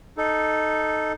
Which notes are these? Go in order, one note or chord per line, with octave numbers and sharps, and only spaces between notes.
D#4 A4